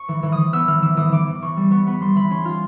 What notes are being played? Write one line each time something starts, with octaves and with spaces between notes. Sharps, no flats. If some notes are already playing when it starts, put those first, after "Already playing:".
Already playing: C#6
E3
E3
D#6
E3
B3 E6
E3 F6
E3 E6
E3 D#6
E3 D6
E3
D6
E3 C#6
G3
B3 C#6
B3 B5
G3 C6
E3 B5
C#4 C6
F4